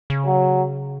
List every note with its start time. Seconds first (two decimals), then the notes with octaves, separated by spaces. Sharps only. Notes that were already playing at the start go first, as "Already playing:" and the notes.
0.10 C#3
0.27 F#3